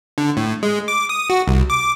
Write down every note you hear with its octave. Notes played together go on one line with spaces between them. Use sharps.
D3
A2
G#3
D6
D#6
F#4
C2
D6